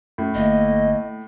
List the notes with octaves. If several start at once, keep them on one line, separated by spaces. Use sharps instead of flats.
F#2 A2
G1 A3 A#3 D#5